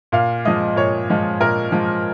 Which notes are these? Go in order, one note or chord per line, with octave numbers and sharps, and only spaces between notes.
A#2 F5
F3 G#3 D#5
A#2 C#5
F3 G#3
A#2 A#4
F3 G#3